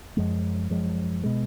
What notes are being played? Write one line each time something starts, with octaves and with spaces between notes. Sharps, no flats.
F#2 F3 G#3
F#2 F3 G#3
B2 G#3